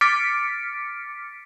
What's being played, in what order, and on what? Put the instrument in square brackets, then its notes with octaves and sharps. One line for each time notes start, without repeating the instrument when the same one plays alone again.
[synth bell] D6 F6 A6 B6 C#7 D7